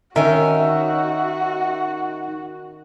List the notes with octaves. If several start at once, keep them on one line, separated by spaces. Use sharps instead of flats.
D#3 C#4 D#4 F#4 E5